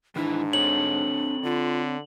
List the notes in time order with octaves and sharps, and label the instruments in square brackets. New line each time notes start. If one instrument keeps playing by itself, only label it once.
[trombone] G#2 [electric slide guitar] D#3 E3 E4 [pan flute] D4
[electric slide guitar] C4 A4 C#5 [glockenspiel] F#7
[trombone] D3 [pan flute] F4